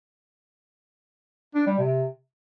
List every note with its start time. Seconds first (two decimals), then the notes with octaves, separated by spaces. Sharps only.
1.55 D4
1.66 G3
1.78 C3